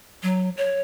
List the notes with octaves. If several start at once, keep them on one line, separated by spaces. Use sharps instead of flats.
F#3
C#5